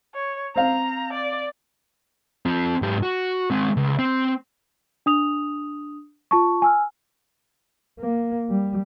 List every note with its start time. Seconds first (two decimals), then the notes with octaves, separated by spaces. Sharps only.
0.15 C#5
0.56 C4 F5 A#5
1.13 D5
2.46 C4 F4
2.82 G#2 G4
3.03 F#4
3.51 G#3 C4
3.77 C#2
3.99 C4
5.06 D4 D#6 F7
6.31 F4 A5 C#6
6.62 G#5 E6 F6
8.00 A#3
8.50 G3